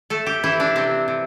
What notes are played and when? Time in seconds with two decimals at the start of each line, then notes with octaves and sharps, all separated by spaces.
0.10 A3 A4
0.26 G4
0.44 E3 E4
0.60 D4
0.76 C3 C4
1.08 C3